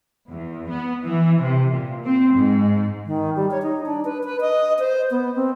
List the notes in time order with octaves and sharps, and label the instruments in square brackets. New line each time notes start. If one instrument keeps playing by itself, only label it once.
[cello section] E2
B3
E3
C3
A#2
C4
G#2
[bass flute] D#3
G3
C#5
D#4
D4
B4
B4
D#5
C5
B3
C4